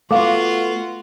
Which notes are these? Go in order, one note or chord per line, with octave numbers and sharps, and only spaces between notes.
A3 B3 F4 F#4 F5 D6